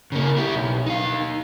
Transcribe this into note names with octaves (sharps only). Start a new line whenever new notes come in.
C#3 A#3
E4 G4
B1
D#4 F5